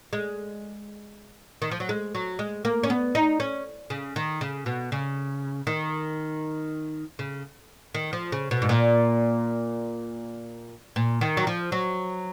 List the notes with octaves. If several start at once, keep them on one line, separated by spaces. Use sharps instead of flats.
G#3
D#3
F3
F#3
G#3
F#3
G#3
A#3
C#4
B3
D#4
C#4
C#3
D#3
C#3
B2
C#3
D#3
C#3
D#3
F3
C#3
B2
G#2
A#2
A#2
D#3
F#3
F3
F#3